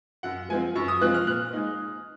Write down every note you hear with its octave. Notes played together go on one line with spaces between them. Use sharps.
F#2 F#5
F3 G#3 C4 F4 G#5
F#2 C#6
D#6
F3 G#3 C4 F4 F#6
F6
A#2 F#6
G#3 D#4